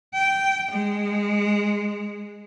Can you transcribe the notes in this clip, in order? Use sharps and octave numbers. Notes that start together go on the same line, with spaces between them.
G5
G#3